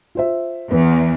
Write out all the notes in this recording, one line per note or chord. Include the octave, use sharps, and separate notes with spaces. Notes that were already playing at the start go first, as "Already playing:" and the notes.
F4 C5 E5
E2 B3